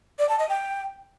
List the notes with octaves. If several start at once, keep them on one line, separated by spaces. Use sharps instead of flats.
D5
A5
D#5
G5